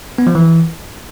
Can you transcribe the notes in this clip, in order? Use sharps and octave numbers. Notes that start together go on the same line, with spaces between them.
B3
F3
E3